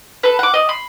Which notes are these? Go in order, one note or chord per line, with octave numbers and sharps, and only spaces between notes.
A4 B4
F#5 D6
D5 D#5
B5 C6